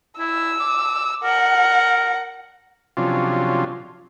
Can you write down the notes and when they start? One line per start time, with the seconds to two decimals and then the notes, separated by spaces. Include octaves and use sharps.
0.19 E4 E6
0.60 D6
1.24 A#4 F#5
2.97 C3 F3 F#3 C#4 D4 F4